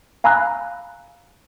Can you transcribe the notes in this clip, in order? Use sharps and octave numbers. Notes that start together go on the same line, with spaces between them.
F5 G#5 A#5 B5 E6 F#6